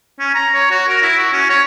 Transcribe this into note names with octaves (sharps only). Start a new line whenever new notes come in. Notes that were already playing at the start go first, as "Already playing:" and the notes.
C#4
A#5
C#5
F#4
A#4
E4
F#4
C#4
C#5